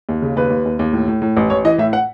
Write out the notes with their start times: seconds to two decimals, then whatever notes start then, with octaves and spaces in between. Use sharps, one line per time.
0.09 D#2
0.22 C#3
0.36 D#2 B4
0.50 D#2
0.65 D#2
0.79 D#2
0.93 A2
1.08 A2
1.22 A2
1.37 A1
1.50 A1 C#5
1.64 E3 D#5
1.78 A2 E5
1.93 F#5